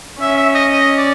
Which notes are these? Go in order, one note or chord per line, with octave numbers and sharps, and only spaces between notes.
C#4 E5
E5
D#5
D#5
D5